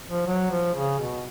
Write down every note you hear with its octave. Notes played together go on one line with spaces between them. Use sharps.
F3
F#3
F3
C#3
B2